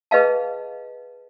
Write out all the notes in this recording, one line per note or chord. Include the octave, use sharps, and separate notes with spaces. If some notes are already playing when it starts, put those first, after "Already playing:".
G#4 B4 D#5 F5 A5